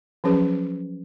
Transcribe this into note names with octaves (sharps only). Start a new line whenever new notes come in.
F3 F#3 C#4 G#4 B4